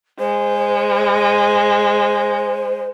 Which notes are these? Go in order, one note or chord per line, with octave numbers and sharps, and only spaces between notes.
G#3 C5